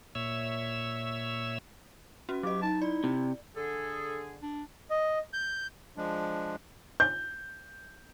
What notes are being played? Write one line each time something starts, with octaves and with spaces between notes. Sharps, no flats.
A#2 C#5 E5 E6
C#4 F#4
F#3 G4 D#5
D#4 A5
E4 D5
C3
D3 G#4 A4
D4
D#5
G6
F3 G#3 D4
G6